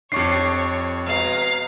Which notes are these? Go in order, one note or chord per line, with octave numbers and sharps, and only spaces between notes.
F2 D4 G4 C#5 C#6 C7
B2 G#3 F5 A#5